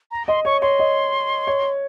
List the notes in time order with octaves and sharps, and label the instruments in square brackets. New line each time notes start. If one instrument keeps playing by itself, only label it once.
[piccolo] A#5
[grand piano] D#5 [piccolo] C6
[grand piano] C#5 [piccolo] C#6
[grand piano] C#5 [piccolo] C6
[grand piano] D#5
C#5